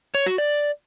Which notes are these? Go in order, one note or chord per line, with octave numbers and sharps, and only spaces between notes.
C#5
F#4
D5